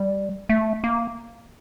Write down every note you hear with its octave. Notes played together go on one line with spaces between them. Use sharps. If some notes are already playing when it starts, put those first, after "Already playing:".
Already playing: G3
A3
A#3